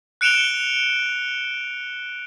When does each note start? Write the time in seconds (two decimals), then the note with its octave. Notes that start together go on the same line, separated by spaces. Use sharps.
0.21 F#6 C#7 D7 E7 F7 G7